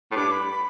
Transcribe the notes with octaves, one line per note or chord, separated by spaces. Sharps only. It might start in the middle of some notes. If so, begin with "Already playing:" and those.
A2
G2 D6
B5
B5